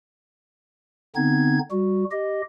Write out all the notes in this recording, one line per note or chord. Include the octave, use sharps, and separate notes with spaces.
D3 B3 C4 D#4 G#6
G3 F#4
G4 D#5